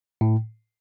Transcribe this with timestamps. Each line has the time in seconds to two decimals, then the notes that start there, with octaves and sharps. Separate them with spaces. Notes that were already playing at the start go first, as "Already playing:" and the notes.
0.21 A2